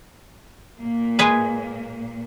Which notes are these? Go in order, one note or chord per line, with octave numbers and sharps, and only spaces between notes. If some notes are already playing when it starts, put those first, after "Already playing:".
A#2 A#3
G#3 G#4 B4